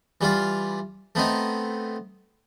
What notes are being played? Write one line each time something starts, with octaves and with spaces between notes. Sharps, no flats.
E3 G3 F4 F5
A3 B3 C4 D#4